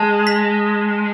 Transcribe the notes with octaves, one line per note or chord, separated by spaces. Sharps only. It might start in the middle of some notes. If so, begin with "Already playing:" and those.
Already playing: G#3 A5
B6